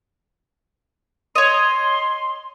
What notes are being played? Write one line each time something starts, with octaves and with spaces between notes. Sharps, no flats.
C#5 D#5 C6